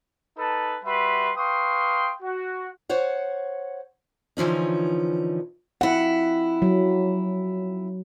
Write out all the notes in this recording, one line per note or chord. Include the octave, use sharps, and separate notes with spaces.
D#4 A4 B4 A5
G3 F#4 B4 E5 C6
B4 F5 G5 C6 C#6 D#6
F#4
C5 C#5 F#5
D3 E3 F3 C#4 D#4
F2 E4 F#5
F#3